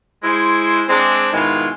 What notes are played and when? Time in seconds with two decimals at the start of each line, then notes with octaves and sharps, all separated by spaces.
0.24 G#3 E4 C5
0.89 G#3 C4 D4
1.33 G#2 B2 D#3 G#3 E4 F4